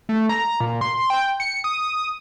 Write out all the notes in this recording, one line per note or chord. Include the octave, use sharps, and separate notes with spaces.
A3
A#5
A#2
C6
G5
C#7
D#6